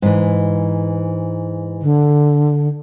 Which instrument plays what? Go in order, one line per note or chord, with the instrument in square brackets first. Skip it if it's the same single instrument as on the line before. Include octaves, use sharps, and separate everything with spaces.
[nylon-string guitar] G#2 E3
[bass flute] D3